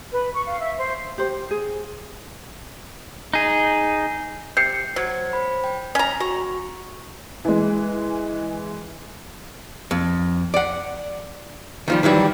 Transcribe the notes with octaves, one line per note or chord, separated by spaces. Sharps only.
B4
C#6
F5
E5
C5
G4 C5
G#4
D#4 G#4
C3 G6 C7 C#7
F#3 C5 G#6
C5 B5
G5
C#4 A#5
F#4 A#5 C#6
E3 G#3
F2
D5 F#5
D#3 F3 G3
D#3 E3 F#3 G3